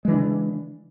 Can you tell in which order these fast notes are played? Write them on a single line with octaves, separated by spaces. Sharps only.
G#3 E3 D4 C#3